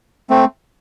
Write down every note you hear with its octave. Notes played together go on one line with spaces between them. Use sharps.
A3 C4